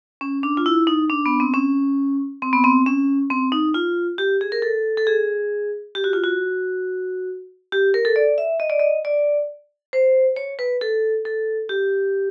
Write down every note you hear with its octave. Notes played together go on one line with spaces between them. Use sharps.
C#4
D4
F4
E4
D#4
D4
B3
C4
C#4
C4
B3
C4
C#4
C4
D#4
F4
G4
G#4
A#4
A4
A4
G#4
G4
F#4
F4
F#4
G4
A#4
A4
D5
E5
D#5
D5
D#5
D5
C5
C#5
B4
A4
A4
G4